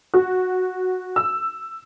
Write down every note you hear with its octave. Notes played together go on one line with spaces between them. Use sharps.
F#4
E6